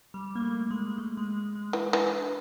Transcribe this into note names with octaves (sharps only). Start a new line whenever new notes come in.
G3
A#3
A3
G#3
A3
G#3
G#3
E3
E3
D4